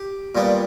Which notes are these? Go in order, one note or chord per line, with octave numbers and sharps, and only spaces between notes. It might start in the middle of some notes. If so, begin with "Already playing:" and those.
Already playing: G4
A#2 G3 B3